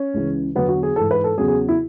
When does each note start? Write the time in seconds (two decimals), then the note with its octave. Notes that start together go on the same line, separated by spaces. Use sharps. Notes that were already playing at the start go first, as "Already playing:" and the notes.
Already playing: C#4
0.14 C#2 C#3 E3
0.55 E2 D3 F#3 B3
0.69 F#4
0.83 G#4
0.96 G#2 E3 A4
1.11 B4
1.24 A4
1.38 E2 C#3 F#3 G#4
1.48 G#4
1.69 E4